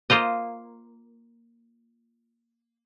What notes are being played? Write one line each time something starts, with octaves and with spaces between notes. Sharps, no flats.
A#3 F4 C5 D#5